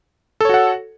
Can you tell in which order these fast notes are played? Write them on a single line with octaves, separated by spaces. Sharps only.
A4 C#5 F#4 F#5